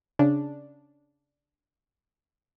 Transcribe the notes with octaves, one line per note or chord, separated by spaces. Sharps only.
C#3 D4